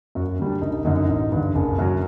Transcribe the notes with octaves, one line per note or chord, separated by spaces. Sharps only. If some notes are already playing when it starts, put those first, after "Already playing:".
F#2 F#4
D3 G3
D4
F#1 D#4
D#4
F#2 D3 D#4
D#4
A1 D#4
G2 D3
F#1
F#2 F#3